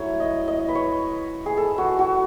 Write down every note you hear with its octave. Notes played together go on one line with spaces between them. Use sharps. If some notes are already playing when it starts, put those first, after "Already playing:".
Already playing: F#3 A3 E4 C#5
D#5
D#5
B4
C#5
G#4
A4
F#4
F#4